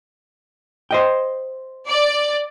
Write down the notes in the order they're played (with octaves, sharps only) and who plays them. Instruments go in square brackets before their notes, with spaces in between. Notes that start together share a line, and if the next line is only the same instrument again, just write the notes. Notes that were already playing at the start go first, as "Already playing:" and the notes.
[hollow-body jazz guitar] C5 D#5 G5
[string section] D5